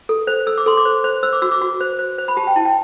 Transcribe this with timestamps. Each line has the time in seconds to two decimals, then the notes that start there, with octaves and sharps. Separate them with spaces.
0.09 A4
0.27 C5
0.47 A4 E6
0.58 D6
0.66 A4 C6
0.77 D6
0.85 C5
1.04 C5
1.23 C5 E6
1.33 D6
1.42 F#4 E6
1.52 D6
1.61 F#4
1.81 C5
1.99 C5
2.18 C5
2.28 B5
2.37 G4 A5
2.47 G5
2.56 E4 A5
2.65 G5